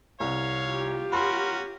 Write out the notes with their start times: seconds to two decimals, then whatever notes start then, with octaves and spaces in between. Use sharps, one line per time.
0.20 C2 C#5 F5
0.68 F4 G4
1.12 C#4 F#4 A#4 B5 C6